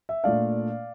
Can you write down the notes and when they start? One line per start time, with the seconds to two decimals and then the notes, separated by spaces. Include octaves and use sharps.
0.09 E5
0.24 A#2 A3 D4 D5 F5